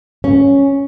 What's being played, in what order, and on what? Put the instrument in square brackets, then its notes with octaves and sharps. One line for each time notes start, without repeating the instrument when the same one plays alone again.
[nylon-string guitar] C#4